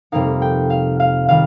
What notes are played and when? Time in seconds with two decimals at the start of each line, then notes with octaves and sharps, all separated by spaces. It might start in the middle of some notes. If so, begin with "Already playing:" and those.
0.12 F2 C3 G3 A#3 D#4 F5
0.42 G5
0.70 F5
1.00 F5
1.29 D#3 G3 F5